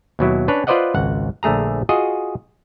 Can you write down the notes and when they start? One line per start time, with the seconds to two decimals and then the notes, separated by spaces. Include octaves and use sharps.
0.19 D#2 B2 F#3 E4
0.48 C#4 D4 B4 C#5
0.67 F4 B4 C5 D5 D#5 F#5
0.94 G#1 C#2 F#5
1.43 A#1 D3 A3 G#4 A#5
1.89 F4 F#4 G#4 D#5